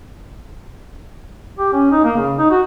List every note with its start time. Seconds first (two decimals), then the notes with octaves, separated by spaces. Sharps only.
1.59 G4
1.73 C#4
1.91 D#4
2.04 A#3
2.17 C#3
2.38 D#4
2.50 F#4